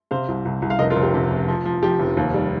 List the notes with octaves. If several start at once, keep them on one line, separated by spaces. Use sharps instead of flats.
C3 C5 F5
C2
C2
C2
F5
F1 A#4 D#5
F4 A#4
F1
G4
C3
F1
F3
F3
F3 G4
F1
D#2
G3